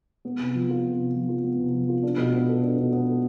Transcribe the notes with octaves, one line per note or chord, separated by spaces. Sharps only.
B3
C3
F3
F4
B3
C3
F3
F4
B3
C3
F3
F4
D4
B2
B3
A4
D4
B2
B3
A4